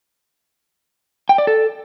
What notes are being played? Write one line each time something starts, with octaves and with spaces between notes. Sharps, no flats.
G5
D5
A4